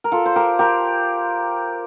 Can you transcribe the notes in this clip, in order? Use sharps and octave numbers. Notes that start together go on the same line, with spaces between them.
A#4
F4 A4
C5
G4 A#4
G4 A#4